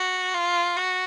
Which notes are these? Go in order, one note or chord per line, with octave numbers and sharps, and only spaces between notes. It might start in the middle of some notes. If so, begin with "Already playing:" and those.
Already playing: F#4
F4
F#4